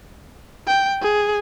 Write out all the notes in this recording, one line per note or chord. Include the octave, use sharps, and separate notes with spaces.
G5
G#4